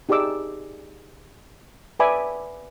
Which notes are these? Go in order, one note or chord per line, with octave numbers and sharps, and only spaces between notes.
D#4 G4 G#4 D5 D6 E6
B4 D5 E5 G#5 B5 D6